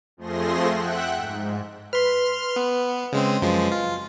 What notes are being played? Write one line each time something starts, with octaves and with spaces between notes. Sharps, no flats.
F2 F3 A3 G#4 C6 A#6
E5 F#5 G5 F#6
G#2
B4 C6 F6
B3
C#3 G#3 C4
F#2 F3 G#3
F4